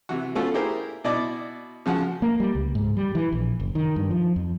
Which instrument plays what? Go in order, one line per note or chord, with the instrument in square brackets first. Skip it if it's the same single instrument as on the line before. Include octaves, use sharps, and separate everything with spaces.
[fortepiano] C3 E3 F#4
A3 B3 C#4 F4 F#4 A4
E4 G4 G#4 A#4 C5
B2 E4 D5 D#5 D6
C#3 F3 F#4 F#5
[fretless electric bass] A#3
G3
C#2
G#2
G3
E3
A#1
F#1
D#3
G2
F3
F2